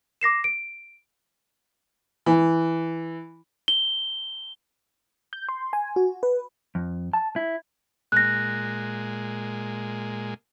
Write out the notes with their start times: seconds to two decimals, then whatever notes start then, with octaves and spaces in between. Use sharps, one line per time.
0.21 D6 A#6 C7 E7
0.44 D7
2.26 E3
3.68 G7
5.33 G6
5.49 C6
5.73 G#5
5.96 F#4
6.23 B4
6.75 F2
7.13 A5
7.36 E4
8.12 A#2 G#3 F#6 A#6